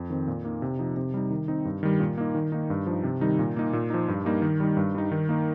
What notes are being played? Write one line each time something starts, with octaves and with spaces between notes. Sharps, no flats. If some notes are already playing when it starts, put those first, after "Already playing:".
Already playing: F2
D#3 C4
A#2
A#3 D#4
C3
F3 D#4
C3
G3 D#4
D#3
C4 D#4
G2
D#3 G3
A#2
A#3 D#4
D#3
A#3 D#4
G2
F3 D#4
C3
D#3 G3 D#4
A#2
A#3 D#4
A#2
F3 D#4
G2
G3 A#3 D#4
D#3
G3 D#4
G2
G3 D#4
D#3
A#3 D#4